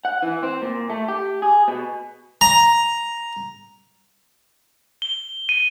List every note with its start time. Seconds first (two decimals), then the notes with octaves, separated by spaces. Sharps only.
0.05 F#5
0.23 E3
0.43 C4
0.62 A#2
0.90 A3
1.08 G4
1.42 G#4
1.68 B2
2.41 A#5
5.02 G7
5.49 D#7